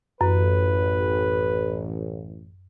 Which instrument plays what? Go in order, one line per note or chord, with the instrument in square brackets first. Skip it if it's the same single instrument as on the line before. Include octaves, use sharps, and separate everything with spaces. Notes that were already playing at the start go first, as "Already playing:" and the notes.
[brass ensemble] A1 [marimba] F#2 [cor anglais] B4